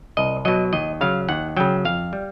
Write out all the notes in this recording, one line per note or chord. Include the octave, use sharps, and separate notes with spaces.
C2 D#5
B2 F#3 D#5
D#2 D#5
C#3 F#3 F5
D#2 F#5
C#3 F#3 G5
F2 F5
G3